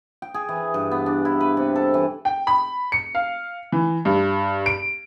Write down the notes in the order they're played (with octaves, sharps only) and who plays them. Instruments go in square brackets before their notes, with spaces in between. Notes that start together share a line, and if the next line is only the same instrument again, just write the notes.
[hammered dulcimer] G5
G#4
E3
G2
B3
D4
E4
B4
C3
A4
E3
[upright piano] G5
B5
C#7
F5
E3
G2
D7